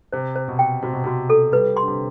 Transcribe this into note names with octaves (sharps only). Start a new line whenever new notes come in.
C3 C5
C5
B2
G5
C3 F#4
B2
C3 F#4
A4
G3 B4
C6
D3
C3